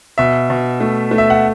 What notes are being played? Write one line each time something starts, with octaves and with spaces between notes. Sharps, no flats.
B2 E5
B2
A3
A3
E5
F#5